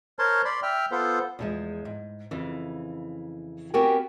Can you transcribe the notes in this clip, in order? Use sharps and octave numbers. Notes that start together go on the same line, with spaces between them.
A#4 C5 C#5 A5 C6
D5 B5 C6
E5 G5 F6
B3 F4 A4 C5
E2 F3 G#3
G#2
F2 C#3 E3
B3 C4 F#4 G4 A#4 G#5